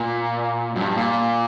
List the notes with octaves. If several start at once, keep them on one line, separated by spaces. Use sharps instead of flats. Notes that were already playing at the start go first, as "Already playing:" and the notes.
Already playing: A#2
F#2
G2
A#2